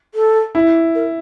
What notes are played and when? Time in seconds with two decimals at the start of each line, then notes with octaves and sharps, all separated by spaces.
0.15 A4
0.55 E4
0.95 A#4